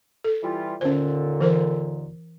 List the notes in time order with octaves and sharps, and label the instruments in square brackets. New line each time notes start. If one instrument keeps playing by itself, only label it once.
[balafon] A4
[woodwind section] E3 G3 F4
[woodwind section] D#2 A#2 D3 [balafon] C#4 C5
[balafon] E3 A#4 C5